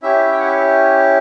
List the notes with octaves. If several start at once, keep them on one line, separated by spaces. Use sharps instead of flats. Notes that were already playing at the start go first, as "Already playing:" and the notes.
C#4 E4 G4 E5
G5
F#5
E5